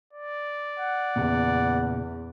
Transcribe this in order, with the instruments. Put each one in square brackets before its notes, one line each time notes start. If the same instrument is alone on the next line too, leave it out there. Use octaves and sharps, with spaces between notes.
[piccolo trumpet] D5
[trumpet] F#5
[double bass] E2 [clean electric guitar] A#2 C#3